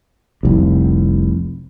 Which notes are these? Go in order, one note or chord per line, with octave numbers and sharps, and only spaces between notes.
F1 C2